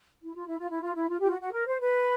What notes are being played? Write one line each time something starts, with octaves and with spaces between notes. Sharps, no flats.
E4
F4
E4
F4
E4
F4
E4
F4
F4 G4
F#4
F#4
A#4
C5
B4